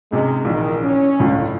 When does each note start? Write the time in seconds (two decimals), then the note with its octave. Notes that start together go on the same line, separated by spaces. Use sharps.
0.12 G#2 C3 G#3 C#4
0.45 A#1 D#3 E3
0.82 C#4
1.19 G1 C#2 A2